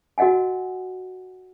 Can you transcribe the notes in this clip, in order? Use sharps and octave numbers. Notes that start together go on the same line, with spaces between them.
F#4 A#4 D#5 F#5 G#5